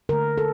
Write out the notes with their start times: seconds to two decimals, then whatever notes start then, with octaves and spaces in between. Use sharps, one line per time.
0.09 D3 A3 A#4
0.38 A4